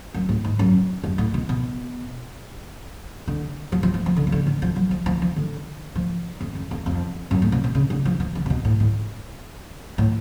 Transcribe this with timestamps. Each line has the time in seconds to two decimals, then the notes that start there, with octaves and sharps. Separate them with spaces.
0.14 F#2
0.29 A2
0.45 G#2
0.59 F#2
1.04 F#2
1.18 A2
1.34 B2
1.49 B2
3.28 D3
3.72 F3
3.83 F3
3.94 F3
4.06 F3
4.17 D3
4.27 F3
4.32 D3
4.46 D3
4.62 F3
4.76 F#3
4.91 F3
5.06 F3
5.22 F3
5.36 D3
5.96 F3
6.41 F2
6.55 F#2
6.71 F2
6.86 F2
7.31 F#2
7.42 A2
7.52 B2
7.64 B2
7.75 C#3
7.90 D3
8.05 F3
8.20 F3
8.35 D3
8.46 C#3
8.50 B2
8.65 A2
8.80 A2
9.98 A2